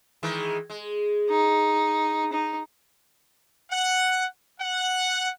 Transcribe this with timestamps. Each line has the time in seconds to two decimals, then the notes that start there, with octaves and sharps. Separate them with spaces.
0.23 D#3 E3 G#3
0.70 G#3
1.30 D#4
2.33 D#4
3.71 F#5
4.60 F#5